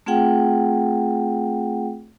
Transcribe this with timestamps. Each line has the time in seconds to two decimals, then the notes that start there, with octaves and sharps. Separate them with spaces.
0.06 A3 C4 F4 G#4 F#5 G5